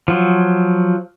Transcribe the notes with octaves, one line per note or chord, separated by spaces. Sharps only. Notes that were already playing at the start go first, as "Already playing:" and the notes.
F3 F#3